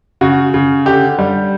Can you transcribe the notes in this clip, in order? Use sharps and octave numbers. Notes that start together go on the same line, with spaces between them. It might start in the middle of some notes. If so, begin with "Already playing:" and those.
C#3 F#4
C#3
D3 G4
G3